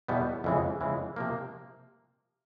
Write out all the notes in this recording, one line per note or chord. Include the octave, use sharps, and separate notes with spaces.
E2 B2 G3 B3
F2 C#3 E3 G#3
F2 C#3 E3 G#3
C3 F3 A#3